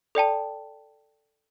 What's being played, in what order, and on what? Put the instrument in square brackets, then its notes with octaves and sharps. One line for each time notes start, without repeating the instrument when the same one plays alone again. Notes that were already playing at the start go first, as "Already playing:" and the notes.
[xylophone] A4 D5 G5 A5